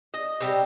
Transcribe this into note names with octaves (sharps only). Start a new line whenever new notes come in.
D#5
C3 E3 G3